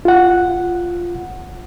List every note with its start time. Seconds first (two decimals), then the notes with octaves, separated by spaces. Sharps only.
0.05 F4 F#5